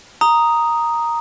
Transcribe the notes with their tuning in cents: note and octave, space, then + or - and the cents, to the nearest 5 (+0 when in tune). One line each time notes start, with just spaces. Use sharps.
A#5 +0 D#6 +0